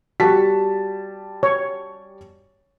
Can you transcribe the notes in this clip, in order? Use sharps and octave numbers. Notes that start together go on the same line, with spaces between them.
G3 F#4 A5 B6
C#5